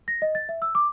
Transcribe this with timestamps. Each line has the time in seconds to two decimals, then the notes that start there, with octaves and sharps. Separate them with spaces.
0.08 A#6
0.22 D#5
0.35 A6
0.49 E5
0.62 E6
0.75 D6